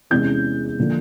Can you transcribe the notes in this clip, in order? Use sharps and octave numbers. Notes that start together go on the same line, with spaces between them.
E2 C3 E3 G#3 C#4 G6
D3 F3 A#3